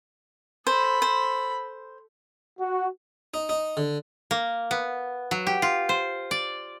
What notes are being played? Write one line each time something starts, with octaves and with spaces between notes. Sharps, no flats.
A4 C5 B5
C5
F#4
D#4
D#4
D3
A#3
B3
F#3
G4
F4
C5
D5